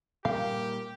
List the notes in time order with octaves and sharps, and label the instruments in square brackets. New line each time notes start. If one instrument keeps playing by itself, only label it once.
[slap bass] A#2 G3 A#3 [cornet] G4 [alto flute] A#4 [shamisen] F5